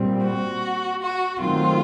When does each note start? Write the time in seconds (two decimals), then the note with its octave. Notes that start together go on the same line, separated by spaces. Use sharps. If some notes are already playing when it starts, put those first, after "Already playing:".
Already playing: A#2 G3 C4
0.23 F#4
1.01 F#4
1.40 D#3 F#3 A3 C4 F4